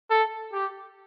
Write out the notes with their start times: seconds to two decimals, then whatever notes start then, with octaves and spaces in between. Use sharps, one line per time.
0.10 A4
0.53 G4